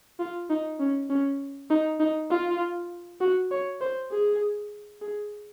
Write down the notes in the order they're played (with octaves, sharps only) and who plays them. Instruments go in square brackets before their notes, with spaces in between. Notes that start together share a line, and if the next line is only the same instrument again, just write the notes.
[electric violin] F4
D#4
C#4
C#4
D#4
D#4
F4
F#4
C#5
C5
G#4
G#4